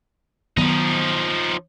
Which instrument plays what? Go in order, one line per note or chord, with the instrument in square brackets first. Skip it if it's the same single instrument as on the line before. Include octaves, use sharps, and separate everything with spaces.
[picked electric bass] D#3 F#3 B3 [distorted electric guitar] F3 D#4